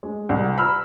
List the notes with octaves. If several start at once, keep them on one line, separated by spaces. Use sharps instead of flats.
G#3
C2
A#5 B5 E6 F6